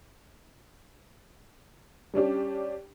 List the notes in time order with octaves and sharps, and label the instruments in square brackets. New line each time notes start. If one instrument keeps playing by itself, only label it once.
[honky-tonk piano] G3 C#4 D4 G4